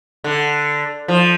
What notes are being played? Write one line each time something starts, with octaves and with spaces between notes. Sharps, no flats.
D3
F3